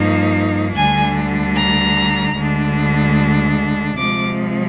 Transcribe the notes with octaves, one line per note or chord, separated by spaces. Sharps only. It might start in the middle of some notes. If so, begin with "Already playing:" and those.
Already playing: G2 F3 A#3 D#4
D2 D3 G3 D4 G#5
A#5
D2 D3 G#3 D4
C3 F3 G#3 D6